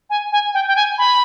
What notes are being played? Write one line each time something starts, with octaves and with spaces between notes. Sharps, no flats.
G#5
G#5
G5
G5
G#5
B5